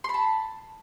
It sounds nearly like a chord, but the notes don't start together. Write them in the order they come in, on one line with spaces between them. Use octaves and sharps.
C6 B5 A5